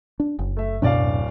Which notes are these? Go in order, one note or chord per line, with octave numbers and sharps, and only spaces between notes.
D4
F#1
A3 E5
D1 F#2 B2 D4 D5 F5